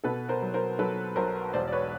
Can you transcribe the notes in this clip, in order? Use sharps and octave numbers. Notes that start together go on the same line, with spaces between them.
B2 A4 B4
A#4 C5
F#3
A#4 C5
F#3 A4 B4
B1 A#4 C5
E1 C5 D5
D5
B4 C#5